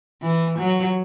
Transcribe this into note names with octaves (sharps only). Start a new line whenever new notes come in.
E3
F#3